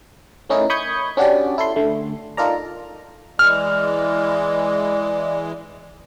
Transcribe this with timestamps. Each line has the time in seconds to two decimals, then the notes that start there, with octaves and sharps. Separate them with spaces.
0.49 A3 C#4 D#4 E4 A#4
0.70 B5 C#6 D#6 G6 G#6 C#7
1.17 C#4 D4 F#4 G4 D5
1.58 E4 A4 C6
1.76 D3 A3
2.37 D#4 F4 A4 A#4 D5 A#5
3.39 E3 G#3 D5 F6